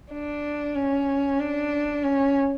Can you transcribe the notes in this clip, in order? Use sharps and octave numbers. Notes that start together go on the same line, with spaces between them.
D4
C#4
D4
C#4